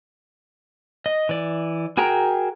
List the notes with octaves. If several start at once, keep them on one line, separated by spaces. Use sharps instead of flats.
D#5
E3 D5
F#4 G#4 A#4 G5 A#5